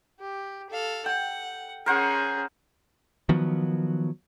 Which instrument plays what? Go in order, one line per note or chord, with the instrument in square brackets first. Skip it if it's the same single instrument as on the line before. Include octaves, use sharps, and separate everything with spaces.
[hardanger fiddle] G4
A4 F5
[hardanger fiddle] F#5 [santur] G5
[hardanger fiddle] C#4 G#4 [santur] A#4 C5 F#5
[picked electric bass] D#3 F3 F#3 B3